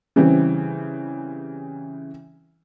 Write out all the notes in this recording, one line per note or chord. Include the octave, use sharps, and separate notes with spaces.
C#3 E3 G3 C4